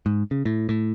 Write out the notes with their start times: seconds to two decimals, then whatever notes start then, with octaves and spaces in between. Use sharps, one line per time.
0.06 G#2
0.31 C#3
0.45 A2
0.69 A2